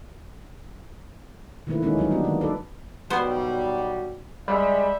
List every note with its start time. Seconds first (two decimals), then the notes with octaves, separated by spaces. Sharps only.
1.67 D#3 E3 A3 A#3 E4 B4
1.82 D#3 E3 G#3 A#3 C#4 D#4
1.97 D3 F#3 G3 D#4
2.11 E3 B3 D4 F#4
2.24 D#3 A#3
2.41 D#4 A4 B4 D5
3.10 B1 B2 G3 B3 F#4 C5
4.48 G3 G#3 D5 E5